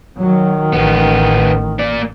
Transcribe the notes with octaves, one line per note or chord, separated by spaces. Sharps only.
D#3 F#3
A1 D#2 B3
A#3 D5